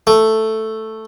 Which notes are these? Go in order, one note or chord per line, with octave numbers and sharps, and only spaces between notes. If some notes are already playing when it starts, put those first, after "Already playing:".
A3